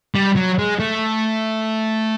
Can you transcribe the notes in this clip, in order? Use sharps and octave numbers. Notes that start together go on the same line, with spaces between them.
G3
F#3
G#3
A3